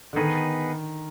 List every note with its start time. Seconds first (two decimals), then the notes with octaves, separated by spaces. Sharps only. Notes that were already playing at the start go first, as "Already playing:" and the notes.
0.13 D3
0.16 D#3 B3 D#4 G#4 B4